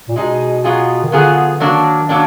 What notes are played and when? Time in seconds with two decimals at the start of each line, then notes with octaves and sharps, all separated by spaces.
0.08 A#2
0.16 B2 G#3 D#4 G#4
0.64 F#3 B3 F4 G#4
1.04 D#3
1.12 D3 F#3 B3 F4 G#4
1.60 D#3 F#3 A#3 D4
2.09 F#3 A#3 D4